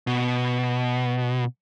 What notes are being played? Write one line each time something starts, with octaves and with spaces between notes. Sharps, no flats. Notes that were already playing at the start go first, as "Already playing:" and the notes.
B2